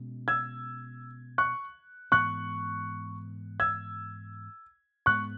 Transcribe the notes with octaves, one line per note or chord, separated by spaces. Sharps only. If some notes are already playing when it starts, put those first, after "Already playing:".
Already playing: B2 G#3 C#4
E6 G#6
C#6 F#6
G#2 E3 B3 C#6 F#6
E6 G#6
G#2 G#3 B3 C#6 F#6